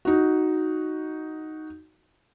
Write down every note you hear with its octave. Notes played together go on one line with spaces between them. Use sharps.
D#4 F#4